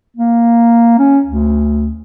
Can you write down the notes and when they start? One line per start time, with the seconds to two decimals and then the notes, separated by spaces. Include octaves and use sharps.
0.17 A#3
0.98 C#4
1.26 D2